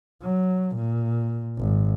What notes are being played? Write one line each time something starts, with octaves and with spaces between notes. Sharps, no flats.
F#3
A#2
G#1